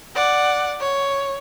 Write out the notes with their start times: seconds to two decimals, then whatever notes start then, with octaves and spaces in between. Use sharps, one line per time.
0.15 D5 F#5
0.80 C#5